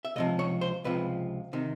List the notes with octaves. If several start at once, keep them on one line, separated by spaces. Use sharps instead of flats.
E5
C#2 C3 F3 D#5
C#5
C5
C#2 C3 F3 B4
C3 D#3